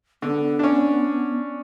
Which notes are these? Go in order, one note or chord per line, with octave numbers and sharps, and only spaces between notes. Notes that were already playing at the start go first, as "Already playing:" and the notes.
D3 B3
C#4 D4